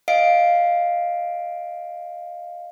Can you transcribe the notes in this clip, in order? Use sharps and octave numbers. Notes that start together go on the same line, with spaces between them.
D#5 F5 C7 D7